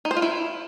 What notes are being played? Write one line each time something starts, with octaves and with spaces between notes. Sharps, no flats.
D#4
C5
F4
E4